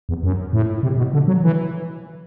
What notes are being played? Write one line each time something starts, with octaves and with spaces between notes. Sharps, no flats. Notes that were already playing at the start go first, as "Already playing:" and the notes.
E2
F#2
A2
C3
B2
D3
F#3
E3